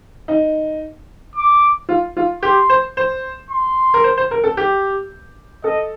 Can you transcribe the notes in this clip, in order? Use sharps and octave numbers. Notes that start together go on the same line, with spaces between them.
D#4
D6
F4
F4
G4 C6
C5
C5
C6
A#4
C5
C5
A#4
A4
G4
A4 D#5